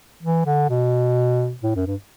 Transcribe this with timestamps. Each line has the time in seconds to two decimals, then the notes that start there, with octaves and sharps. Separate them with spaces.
0.23 E3
0.46 D3
0.70 B2
1.63 A2
1.76 F#2
1.87 G2